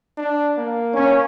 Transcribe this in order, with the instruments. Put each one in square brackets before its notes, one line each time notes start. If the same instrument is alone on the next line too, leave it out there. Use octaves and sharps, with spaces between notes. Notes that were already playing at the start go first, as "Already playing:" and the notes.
[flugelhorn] D4
A#3
[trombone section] C#4